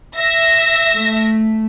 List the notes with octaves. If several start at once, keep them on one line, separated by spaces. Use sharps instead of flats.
E5 A#6
A3